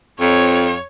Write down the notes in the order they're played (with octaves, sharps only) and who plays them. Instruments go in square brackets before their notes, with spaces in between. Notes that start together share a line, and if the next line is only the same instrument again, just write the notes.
[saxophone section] F2 [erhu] C#5